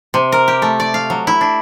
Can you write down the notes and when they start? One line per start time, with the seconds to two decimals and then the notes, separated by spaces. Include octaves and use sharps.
0.14 C3
0.32 A#4
0.48 G4
0.62 A3
0.80 D5
0.94 F5
1.10 F#3
1.27 E4
1.41 D4